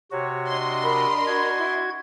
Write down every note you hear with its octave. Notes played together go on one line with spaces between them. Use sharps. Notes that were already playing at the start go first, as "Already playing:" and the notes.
C3 F#4 C#5
D4 D#5 C6
A#4 B5
F#4 G#6
E4